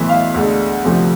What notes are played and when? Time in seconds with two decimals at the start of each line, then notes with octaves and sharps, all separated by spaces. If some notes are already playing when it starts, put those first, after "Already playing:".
Already playing: B1 A2 E3 E5
0.09 F5
0.34 D2 D3 G#3
0.85 D2 C3 F3 A3 C4